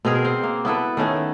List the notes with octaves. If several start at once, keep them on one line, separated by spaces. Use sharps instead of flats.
B2 C4 G#4 A#4
C4
A#3
B3 E4 A4 B4
D#3 A3 C#4 F#5